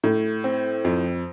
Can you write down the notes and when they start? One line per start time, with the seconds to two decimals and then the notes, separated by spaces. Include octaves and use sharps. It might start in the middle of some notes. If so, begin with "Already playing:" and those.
0.04 A2
0.44 C4
0.85 F2